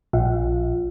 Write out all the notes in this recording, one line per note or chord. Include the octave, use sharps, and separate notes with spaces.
A#1